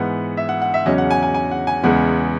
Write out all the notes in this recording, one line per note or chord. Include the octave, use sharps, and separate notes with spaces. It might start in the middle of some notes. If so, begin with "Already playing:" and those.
Already playing: G#2 E3 B3 F#5
E5
F#5
F#5
E5
E2 C#3 F#3 C#4 D#5
F#5
G#5
G#5
G#5
F#5
G#5
E2 C#3 G#3 B3 F#5